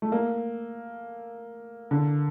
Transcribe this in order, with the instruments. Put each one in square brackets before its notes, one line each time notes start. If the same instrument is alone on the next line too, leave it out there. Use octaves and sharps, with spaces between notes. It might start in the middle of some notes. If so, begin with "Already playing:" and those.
[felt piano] A3
A#3
D3